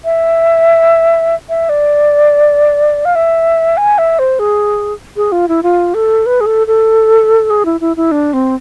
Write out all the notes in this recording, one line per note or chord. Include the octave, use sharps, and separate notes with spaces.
E5
E5
D5
F5
E5
G#5
E5
C5
G#4
G#4
F4
E4
F4
A4
B4
G#4
A4
A4
G#4
E4
E4
E4
D4
C4